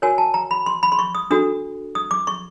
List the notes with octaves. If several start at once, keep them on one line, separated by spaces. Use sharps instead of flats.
F#4 A#4 C#5 G#5
A5
A#5
B5
C6
B5
C6
C#6
D#6
D4 F#4 A4 D#6
D#6
D6
C#6